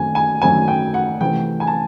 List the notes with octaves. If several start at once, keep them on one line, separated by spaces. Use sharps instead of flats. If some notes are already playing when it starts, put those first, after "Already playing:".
Already playing: F#2 D#3 F#3 A3 C4 G#5
G#5
F#2 D#3 F#3 A3 C4 G#5
G5
F#5
C3 E3 A3 C4 G5
G#5
A5